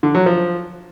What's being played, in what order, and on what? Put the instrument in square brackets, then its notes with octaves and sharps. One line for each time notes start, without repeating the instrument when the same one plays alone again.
[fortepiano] D3
F#3
F3